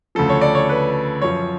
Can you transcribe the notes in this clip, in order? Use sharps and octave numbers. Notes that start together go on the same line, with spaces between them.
D2 C#3 F3 A4
C#5
D5
C#5
B4
F#2 F3 C#5